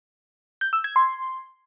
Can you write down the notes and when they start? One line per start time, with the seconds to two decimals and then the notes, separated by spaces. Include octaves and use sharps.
0.61 G6
0.73 E6
0.84 G#6
0.96 C6